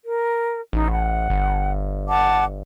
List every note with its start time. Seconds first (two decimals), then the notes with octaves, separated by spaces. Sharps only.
0.05 A#4
0.73 A1 D#4
0.90 F#5
1.30 G1
2.09 F#5 A5 D6